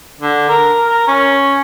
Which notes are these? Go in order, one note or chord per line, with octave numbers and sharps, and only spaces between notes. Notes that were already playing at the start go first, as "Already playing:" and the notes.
D3
A#4
A#4
C#4